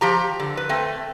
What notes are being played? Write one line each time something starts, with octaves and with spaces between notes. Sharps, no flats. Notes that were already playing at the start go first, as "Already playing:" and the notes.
F3 G4 A#5
D3
B4
A3 C4